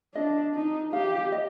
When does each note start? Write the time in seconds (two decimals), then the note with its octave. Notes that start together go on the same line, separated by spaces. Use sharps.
0.15 D4 D#5
0.55 D#4
0.93 G4 F5
1.32 D#5